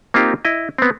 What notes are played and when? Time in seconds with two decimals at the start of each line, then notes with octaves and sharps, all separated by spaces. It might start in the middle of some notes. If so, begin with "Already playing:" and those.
0.14 A#3 C4 D#4 F4 G4
0.45 E4 D#5
0.78 B3 C4